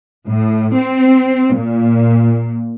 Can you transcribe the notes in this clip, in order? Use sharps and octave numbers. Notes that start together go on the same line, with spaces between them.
A2
C4
A#2